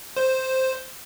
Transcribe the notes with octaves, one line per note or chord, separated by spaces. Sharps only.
C5